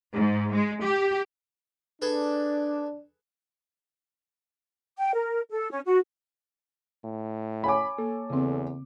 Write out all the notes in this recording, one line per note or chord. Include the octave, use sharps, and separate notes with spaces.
G#2
G#3
G4
D4 G#4 A4 B4
G5
A#4
A4
C#4
F#4
A2
C#5 G#5 B5 D6
A#3 A4
E2 C#3 C4